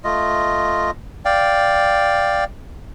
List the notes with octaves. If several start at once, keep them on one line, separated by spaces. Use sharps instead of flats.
A3 F4 D#5
D5 F5 G5